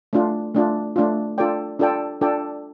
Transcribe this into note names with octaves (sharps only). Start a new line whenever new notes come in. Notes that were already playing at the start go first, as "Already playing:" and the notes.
A3 D4 F4
A3 D4 F4
A3 D4 F4
D4 F4 A4 D5 G5
D4 F4 A4 D5 G5
D4 F4 A4 D5 G5